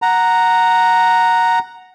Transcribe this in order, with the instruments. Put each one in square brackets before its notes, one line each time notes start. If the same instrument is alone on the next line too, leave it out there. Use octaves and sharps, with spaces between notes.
[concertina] F#5 A#5